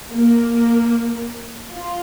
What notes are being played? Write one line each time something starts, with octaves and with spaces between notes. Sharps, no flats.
A#3
F4